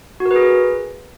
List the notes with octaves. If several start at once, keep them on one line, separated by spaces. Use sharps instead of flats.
F#4
A#4
B4
G#4